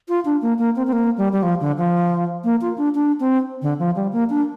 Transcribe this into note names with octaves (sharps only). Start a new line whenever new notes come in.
F4
D4
A#3
A#3
C4
C4
A#3
G3
G3
F3
D3
F3
A#3
F4
D4
D4
C4
D3
F3
G3
A#3
D4